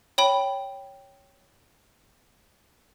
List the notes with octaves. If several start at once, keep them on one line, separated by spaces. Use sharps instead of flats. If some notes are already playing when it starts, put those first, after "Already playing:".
C#5 G5 B5